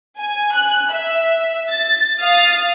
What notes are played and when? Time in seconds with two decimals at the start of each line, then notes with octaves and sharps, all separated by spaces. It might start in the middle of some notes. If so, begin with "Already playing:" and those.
0.19 G#5
0.54 F#6
0.92 E5
1.71 A6
2.21 F5 D#6 F6 A6